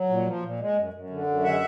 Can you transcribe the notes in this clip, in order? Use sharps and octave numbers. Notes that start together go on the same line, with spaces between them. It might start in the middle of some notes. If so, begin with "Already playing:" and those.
Already playing: F#3
A#2
F3
A#2
G#3
F#2
F#2
D3
F#2
G#3 E5 F#5